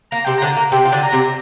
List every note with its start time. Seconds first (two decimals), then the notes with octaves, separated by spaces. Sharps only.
0.11 A#3 A#5
0.25 C3 C4 G5
0.38 D3 D4 A#5
0.57 A#3
0.72 C3 C4 G5
0.85 F4
0.92 D3 D4
1.03 A#5
1.12 C3 C4